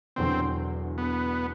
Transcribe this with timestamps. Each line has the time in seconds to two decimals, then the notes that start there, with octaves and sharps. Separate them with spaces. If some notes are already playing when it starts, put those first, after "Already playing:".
0.16 E1 E2 D3 F#3 C4
0.98 B3